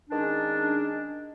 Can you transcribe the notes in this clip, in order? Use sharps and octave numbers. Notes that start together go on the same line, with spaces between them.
D#3 G#3 C#4 D4